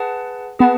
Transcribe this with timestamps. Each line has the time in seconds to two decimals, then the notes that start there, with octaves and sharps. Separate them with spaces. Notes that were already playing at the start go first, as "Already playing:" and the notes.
Already playing: G#4 B4 F#5 A5
0.59 B3 G#4 B4 F#5 A5